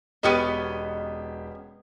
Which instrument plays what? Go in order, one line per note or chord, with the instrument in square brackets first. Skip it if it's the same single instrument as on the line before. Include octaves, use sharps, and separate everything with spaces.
[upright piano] E1 G4 [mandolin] B3 C#4 D#5